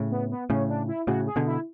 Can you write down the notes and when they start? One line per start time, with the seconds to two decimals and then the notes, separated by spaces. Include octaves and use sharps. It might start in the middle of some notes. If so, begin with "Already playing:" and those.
Already playing: A2 C#3
0.11 B3
0.31 B3
0.50 A2 C#3 C#4
0.69 D4
0.88 E4
1.07 A2 C#3 F#4
1.27 G#4
1.36 B2 D3
1.47 E4